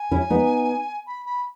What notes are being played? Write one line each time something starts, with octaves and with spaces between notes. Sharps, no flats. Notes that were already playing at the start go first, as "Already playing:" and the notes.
Already playing: G#5
C#4 E4
B3 D#4
B5
B5